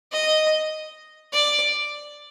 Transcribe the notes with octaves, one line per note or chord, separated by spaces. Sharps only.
D#5
D5